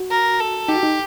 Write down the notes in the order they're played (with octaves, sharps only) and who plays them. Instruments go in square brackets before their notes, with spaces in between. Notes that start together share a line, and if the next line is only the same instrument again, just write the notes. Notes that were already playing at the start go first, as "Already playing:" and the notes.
Already playing: [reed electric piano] F#4
[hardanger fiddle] A#4
A4
[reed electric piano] D#4 [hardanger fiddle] G4
[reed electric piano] F#4
D#4